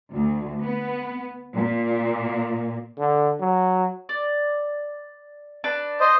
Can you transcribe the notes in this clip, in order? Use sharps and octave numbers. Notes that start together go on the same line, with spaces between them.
D2
B3
A#2
D3
F#3
D5
D4 B4
C5 D#5